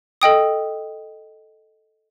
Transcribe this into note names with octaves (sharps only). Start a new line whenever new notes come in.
A4 D#5 G5 D#6